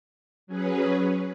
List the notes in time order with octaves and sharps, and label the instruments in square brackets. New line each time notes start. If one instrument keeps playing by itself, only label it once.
[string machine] F#3 C#4 G#4 B4